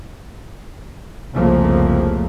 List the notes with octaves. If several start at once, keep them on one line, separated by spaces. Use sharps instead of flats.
C2 F2 C#3 F3 A3 A#3